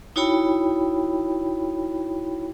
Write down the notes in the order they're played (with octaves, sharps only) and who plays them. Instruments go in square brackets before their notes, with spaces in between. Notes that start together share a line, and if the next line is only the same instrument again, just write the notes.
[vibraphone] D#4 E4 F#4 C#5 G5 B5